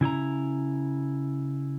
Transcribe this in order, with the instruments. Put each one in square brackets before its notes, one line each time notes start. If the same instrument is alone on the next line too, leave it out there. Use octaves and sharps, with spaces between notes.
[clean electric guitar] C#3 E4 D#5 A#5